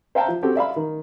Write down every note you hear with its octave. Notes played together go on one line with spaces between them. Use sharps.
C5 E5 F5 G5 A5 A#5
F3
C4 F#4 G4 A4
D5 E5 F5 B5
D#3